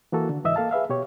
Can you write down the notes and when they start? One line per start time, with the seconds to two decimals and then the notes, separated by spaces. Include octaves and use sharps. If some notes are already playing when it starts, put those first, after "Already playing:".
0.12 E3 A#3 F#4 A4
0.29 D3
0.44 C#2 G#2 E3 D#5 E5 E6
0.56 A#3 A4 F5 A5
0.71 G#4 B4 E5 F5
0.89 B2 G4 C#5